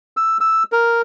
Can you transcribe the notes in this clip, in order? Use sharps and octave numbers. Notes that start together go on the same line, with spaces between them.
E6
E6
A#4